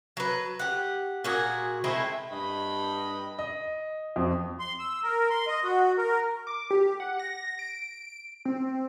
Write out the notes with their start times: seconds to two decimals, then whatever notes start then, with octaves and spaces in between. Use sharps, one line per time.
0.17 F#3 B4
0.60 G4 F#5
1.24 A#2 F#4 G#4
1.84 G#3 A3 C4 E4
2.32 G2 D#5 B5
3.39 D#5
4.16 F2
4.60 C6
4.79 E6
5.03 A#4
5.30 C6
5.47 D#5
5.64 F#4
5.98 A#4
6.47 D6
6.71 G4
7.00 F#5
7.19 A#6
7.59 D7
8.45 C4